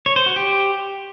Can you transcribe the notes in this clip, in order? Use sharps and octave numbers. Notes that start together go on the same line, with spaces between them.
C#5
C5
F#4
G4